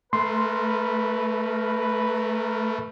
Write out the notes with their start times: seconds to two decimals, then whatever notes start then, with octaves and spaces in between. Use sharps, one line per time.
0.13 A3 A#4 B4 C6